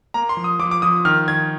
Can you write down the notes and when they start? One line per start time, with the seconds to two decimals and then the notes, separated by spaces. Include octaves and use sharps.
0.14 A#3 A#5
0.29 C6
0.37 F3
0.44 D#6
0.59 F3 D6
0.71 D6
0.82 F3 D#6
1.05 D#3 F6
1.28 D#3 G#6